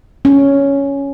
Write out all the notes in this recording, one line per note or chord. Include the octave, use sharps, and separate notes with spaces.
C#4